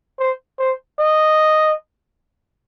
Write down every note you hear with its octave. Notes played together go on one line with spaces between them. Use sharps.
C5
C5
D#5